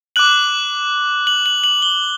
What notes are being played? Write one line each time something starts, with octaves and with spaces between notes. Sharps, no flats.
D6 F#6 F#7
F#7
F#7
F#7
G7